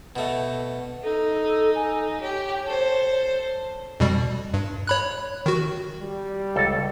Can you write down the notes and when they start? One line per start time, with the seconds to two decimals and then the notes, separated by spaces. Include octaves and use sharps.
0.16 B2 A3
1.03 D#4 A4
1.44 A4
1.75 G#5
2.21 G4 C#5
2.66 A4 C5
4.00 F2 B2 G3
4.54 G2
4.87 C#5 B5 F#6
5.46 D#3 F#4
6.01 G3
6.56 C#2 A4